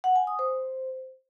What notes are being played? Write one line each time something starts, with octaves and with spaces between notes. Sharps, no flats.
F#5
G#5
D#6
C5